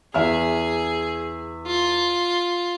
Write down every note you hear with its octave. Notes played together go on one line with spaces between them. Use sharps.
E2 G#4 E5 F6
F4